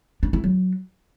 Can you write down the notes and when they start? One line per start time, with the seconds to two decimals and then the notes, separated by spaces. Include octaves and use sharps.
0.23 D4
0.33 E4
0.44 F#3